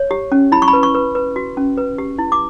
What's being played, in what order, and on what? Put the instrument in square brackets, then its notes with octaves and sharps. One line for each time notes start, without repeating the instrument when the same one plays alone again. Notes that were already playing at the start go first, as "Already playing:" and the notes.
Already playing: [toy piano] C#5
G4
C#4
E4 B5
C#6
B5
B4
C#6
B4
B4
F#4
C#4
B4
G4
E4
D6